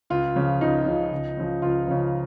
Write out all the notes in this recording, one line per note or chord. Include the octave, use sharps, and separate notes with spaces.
C#2 F4
C#3 F3
C#2 D#4
C#3 F3
C#2
C#3 F3
C#2 F4
C#3 F3